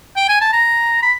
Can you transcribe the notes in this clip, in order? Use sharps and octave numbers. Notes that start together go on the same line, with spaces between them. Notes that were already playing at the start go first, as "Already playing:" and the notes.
G5
G#5
A5
A#5
B5